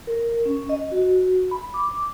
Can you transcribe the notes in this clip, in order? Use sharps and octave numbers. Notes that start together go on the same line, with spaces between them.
A#4
C#4
D#5
F#4
B5
D6